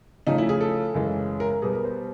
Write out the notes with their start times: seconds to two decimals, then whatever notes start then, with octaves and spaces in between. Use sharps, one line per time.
0.27 C#3 F3 A3 D#4
0.38 E4
0.49 G#4
0.61 A4
0.94 F#2 C#3 E3 G#3
1.40 A#4
1.51 A#4
1.62 B2 G3 B3 G#4
1.73 A#4
1.84 C5